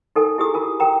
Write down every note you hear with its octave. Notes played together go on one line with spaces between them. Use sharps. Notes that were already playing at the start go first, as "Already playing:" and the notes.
D#4 A4 A#4 G#5
E4 G4 G#4 D#6
F4 A#4 G#5
A#4 G5 A#5